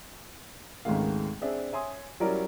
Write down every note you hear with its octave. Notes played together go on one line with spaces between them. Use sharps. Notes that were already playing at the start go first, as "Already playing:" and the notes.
G#1 C#2 D#3 G#3 A3 F5
C4 D4 G#4 E5
C#5 E5 G#5 C6 D#6
F#3 G3 C#4 E4 A#4 D5